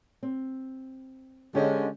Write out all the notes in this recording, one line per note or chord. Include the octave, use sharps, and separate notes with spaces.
C4
D3 G#3 C#4 G4 C5 D#5